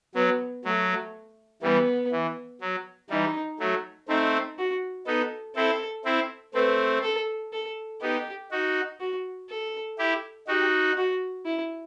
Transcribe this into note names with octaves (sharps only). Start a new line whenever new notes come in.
F#3 B3
F#3 A3
E3 G3 B3
E3
F#3
E3 G3 D#4
F#3 A3
A3 C4 D#4
F#4
B3 D#4 A4
C4 E4 A4
C4 E4
A3 C4 B4
A4
A4
B3 D#4 G4
D#4 F#4
F#4
A4
E4 G4
D#4 F#4 G4
F#4
E4